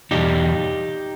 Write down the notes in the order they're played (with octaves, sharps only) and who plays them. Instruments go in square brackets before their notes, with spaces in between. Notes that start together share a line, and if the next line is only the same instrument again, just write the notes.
[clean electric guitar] E2 B2 G3 D#4 G4